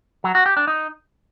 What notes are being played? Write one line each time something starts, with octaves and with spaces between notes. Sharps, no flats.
F#3
F#4
G4
D4
D#4